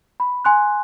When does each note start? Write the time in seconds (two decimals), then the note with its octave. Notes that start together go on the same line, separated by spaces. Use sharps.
0.20 B5
0.45 G#5 C6 F#6